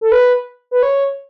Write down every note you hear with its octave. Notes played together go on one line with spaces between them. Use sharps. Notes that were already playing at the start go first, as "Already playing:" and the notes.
A4
B4
B4
C#5